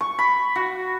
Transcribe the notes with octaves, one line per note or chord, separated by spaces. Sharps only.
C#6
B5
F#4